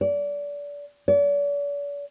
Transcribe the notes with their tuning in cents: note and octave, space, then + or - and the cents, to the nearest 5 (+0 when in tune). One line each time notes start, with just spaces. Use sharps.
D5 -30
D5 -45